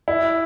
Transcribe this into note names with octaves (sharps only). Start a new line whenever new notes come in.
E4